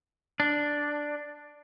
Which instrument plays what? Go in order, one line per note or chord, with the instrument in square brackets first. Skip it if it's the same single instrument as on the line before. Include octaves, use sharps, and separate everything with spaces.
[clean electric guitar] D4